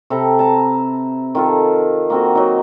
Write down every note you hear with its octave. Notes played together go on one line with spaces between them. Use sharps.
C3 A4 B4 A#5
A5 A#5
D#3 F4 A4
A#3 C4 F#4
F#3 D#4